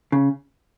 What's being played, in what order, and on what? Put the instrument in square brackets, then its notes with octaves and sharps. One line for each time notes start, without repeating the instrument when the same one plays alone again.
[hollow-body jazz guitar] C#3